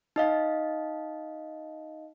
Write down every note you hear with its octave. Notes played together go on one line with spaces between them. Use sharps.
D#4 D#5 F5